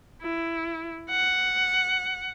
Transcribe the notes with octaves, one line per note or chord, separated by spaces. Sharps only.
E4
F#5